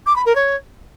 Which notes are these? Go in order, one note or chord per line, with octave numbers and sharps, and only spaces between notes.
D6
B5
A#4
C#5